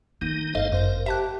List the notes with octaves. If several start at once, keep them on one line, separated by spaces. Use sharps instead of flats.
D#3 G#3 A3 D#4
G1 D#4 A4 C5 D#5 F5
F#2 A#4 C5
G4 E5 A5 F#6